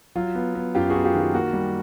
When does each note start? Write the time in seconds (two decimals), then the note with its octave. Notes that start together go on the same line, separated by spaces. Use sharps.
0.15 F#3 F4
0.35 B3
0.55 B3
0.75 F#2 F4 G4
0.90 B3 F#4 G#4
1.04 F4 G4
1.15 D#3 F4
1.34 A#3 F#4
1.53 G3